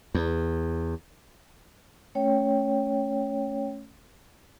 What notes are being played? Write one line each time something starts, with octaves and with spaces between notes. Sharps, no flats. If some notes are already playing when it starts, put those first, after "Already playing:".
E2
A3 C#4 C#5 G5